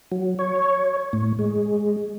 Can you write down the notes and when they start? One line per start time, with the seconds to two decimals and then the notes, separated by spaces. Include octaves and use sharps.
0.12 F#3
0.39 C#5
1.13 A2
1.39 G#3